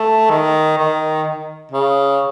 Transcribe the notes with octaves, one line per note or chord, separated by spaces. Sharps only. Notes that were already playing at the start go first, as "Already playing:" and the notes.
Already playing: A3
D#3
D#3
C#3